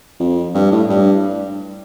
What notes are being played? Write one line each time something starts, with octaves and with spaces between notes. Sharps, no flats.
F2
G2
A2
G2